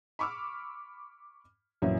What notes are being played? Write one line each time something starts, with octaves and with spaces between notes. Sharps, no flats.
B5 C#6 D6 E6 F6
A#1 F#2 E3 A#3 C#4 E4